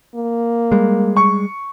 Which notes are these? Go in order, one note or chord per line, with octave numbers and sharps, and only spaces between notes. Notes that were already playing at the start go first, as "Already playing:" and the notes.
A#3
G3 G#3
C#6